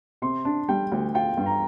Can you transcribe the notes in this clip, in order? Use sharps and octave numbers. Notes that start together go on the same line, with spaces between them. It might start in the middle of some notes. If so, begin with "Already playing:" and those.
C3 C6
D4
G3 G5
D2
F4 G5
G2
A#5